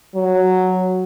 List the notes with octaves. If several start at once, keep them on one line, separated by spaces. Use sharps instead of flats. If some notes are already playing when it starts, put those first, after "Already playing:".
F#3